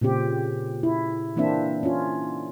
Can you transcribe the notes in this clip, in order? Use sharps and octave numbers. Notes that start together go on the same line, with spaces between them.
A#2 C#3 C4 G4
E4
E3 A#3 C4 D4 E5
C#4 F4